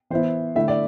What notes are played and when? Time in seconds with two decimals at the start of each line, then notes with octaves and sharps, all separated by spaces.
0.10 E3 B3 E4 C5
0.56 D3 A3 E4 E5
0.68 D5